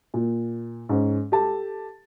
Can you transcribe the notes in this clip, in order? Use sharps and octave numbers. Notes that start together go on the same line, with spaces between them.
A#2
G#2 C#4
G4 A4 A5